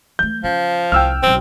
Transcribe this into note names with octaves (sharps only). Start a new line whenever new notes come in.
E3 A3 G6
C#3 F3
C2 G5 E6 F6
B1 C#3 C4